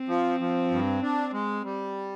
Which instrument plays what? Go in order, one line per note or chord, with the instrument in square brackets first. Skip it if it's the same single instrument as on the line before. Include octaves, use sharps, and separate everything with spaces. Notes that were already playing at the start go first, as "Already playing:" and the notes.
Already playing: [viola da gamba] C4
[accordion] F3
F3
G2
D4
G#3
G3